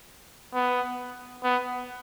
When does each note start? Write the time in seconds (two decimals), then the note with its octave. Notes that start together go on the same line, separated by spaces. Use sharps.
0.54 B3
1.43 B3